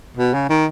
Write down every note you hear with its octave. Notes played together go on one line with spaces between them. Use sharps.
B2
C#3
D#3